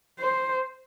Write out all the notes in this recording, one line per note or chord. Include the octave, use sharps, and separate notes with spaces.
C5